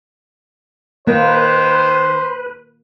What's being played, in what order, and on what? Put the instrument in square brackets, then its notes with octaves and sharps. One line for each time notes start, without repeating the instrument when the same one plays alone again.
[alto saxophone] D#3 [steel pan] A#3 [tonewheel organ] B4 [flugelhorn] C5